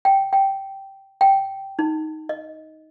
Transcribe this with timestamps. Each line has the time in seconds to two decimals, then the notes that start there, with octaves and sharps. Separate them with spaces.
0.05 G5
0.33 G5
1.21 G5
1.79 D#4
2.29 D#5